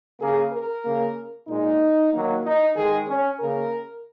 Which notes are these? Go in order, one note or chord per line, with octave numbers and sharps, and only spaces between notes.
C#3 A#3 G#4
A#4
C#3 A#3
A#2 G#3 D#4
D#3 F#3 A#3
D#4
D#3 G#3 G#4
C#4
C#3 A#3 A#4